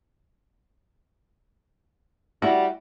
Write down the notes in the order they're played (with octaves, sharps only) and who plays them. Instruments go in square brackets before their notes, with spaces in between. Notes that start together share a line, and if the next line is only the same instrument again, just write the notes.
[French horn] G3 [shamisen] E4 [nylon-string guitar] F#4